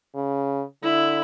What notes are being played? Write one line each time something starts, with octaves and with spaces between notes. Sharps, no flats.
C#3
D3 E4